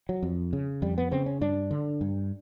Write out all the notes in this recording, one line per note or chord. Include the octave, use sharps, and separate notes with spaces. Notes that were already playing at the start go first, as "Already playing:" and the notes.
F#3
F2
C#3
F2 G3
B3
C#3 C4
C#4
G2 D4
D3
G2